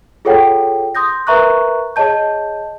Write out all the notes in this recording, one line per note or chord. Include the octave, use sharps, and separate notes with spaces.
F4 G#4 A4 C#5 F#5 G5
C6 D#6 G6 A#6
A#4 B4 E5 A#5 C#6 F#6
G#4 C#5 D#5 A5 G6